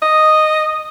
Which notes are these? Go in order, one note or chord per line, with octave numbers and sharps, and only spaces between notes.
D#5